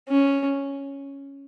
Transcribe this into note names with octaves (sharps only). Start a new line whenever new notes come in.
C#4